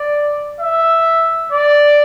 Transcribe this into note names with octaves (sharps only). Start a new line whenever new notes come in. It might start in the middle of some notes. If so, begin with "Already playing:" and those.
Already playing: D5
E5
D5